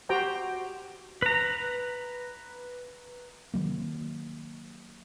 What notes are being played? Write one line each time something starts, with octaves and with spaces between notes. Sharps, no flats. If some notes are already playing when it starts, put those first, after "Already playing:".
F#4 G4 C5 G5 A#5
B4 A#5
C3 D#3 F#3 A#3